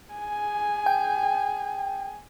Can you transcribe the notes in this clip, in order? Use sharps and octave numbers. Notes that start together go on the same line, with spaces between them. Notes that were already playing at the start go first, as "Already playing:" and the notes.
G#4 G#5
G5